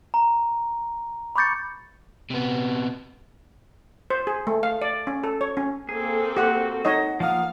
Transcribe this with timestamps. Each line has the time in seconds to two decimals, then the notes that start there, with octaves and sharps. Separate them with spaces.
0.14 A#5
1.36 B5 C#6 D6 G6 A6 C#7
2.30 C3 B3
4.10 C5
4.27 G#4
4.47 A3
4.63 F5
4.82 D5
5.07 C#4
5.24 A4
5.41 C#5
5.57 C#4
5.89 A#3 C4 G#4 A4
6.37 F#4 G4 F#5
6.85 D#4 C#5 D#5 F#5
7.20 F3 A#3 F5 F#5 D#6